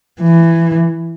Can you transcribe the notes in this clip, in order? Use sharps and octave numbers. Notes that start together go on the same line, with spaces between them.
E3